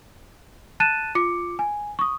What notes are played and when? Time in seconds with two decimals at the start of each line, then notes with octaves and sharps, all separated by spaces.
0.80 A5 F#6 A6 D#7 E7
1.15 F4 D6 C#7
1.59 G#5
1.99 C#6 D#6